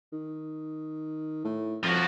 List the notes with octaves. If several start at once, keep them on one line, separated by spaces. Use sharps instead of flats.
D#3
A2
F2 F3 F#4